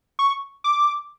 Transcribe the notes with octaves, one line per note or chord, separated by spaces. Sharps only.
C#6
D6